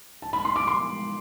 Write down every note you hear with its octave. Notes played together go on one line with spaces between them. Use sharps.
A5
B5
C6
D6
C6